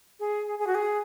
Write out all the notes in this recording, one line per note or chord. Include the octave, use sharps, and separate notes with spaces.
G#4
G#4
F#4
G#4